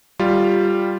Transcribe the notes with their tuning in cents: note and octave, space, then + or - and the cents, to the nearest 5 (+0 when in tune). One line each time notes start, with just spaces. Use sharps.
G3 +0 F4 +0